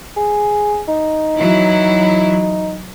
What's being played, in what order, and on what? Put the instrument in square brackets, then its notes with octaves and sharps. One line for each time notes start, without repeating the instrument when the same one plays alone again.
[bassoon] G#4
D#4
[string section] E3 F#3 E4